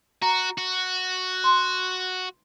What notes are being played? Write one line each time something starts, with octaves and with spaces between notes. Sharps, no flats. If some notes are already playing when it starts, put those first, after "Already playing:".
F#4 A#5
F#4
C6